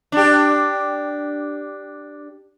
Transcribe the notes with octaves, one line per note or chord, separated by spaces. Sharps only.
D4 G4